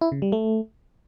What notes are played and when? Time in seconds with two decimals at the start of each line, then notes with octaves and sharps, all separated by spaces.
0.01 E4
0.12 C#3
0.22 G3
0.32 A3